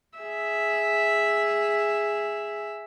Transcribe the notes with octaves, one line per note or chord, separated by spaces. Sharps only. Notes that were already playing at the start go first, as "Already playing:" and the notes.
G#4 E5